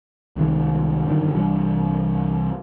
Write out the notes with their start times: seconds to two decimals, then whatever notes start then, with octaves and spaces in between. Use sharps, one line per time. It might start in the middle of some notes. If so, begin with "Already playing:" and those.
0.36 C2 D#3 F#3 G#3
1.05 F#1 G2 D3 D#3
1.33 C2 E3 G3 D4